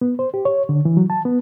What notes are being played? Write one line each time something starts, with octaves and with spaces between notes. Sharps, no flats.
B3
C5
G4
C#5
D3
E3
F#3
A5
B3